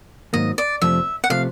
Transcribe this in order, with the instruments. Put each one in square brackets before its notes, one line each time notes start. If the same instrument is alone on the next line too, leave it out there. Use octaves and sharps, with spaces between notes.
[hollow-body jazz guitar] G#2 D#3 F#3 A#3 [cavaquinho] D#5
[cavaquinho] D5
[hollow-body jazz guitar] F2 C3 F3 A3 [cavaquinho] E5
[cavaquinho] F#5
[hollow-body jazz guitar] C3 F3 A3 [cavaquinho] F5